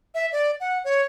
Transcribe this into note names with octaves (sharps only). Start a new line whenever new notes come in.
E5
D5
F#5
C#5